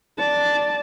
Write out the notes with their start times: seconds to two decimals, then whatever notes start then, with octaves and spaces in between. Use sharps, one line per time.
0.18 D5 A5